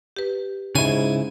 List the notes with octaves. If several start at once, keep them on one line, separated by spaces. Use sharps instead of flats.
G4 B4
G#2 C#3 E4 G#5